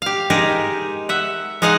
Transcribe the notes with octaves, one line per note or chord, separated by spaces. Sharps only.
G4 F5
G#3 D#4 G4 G#4 A#4
E5 F#5
G#3 D#4 G#4 D#5 F5 F#5